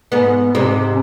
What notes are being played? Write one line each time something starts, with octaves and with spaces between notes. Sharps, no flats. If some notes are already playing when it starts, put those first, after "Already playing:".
G#2 B3
G#2 C3